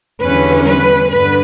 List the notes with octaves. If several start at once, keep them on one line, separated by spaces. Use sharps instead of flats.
E2 D3 G3 C#4 B4
B4
G2 D3 B4